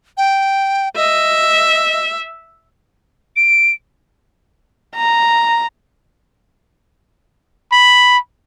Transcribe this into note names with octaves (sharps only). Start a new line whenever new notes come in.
G5
D#5 E5
D7
A#5
B5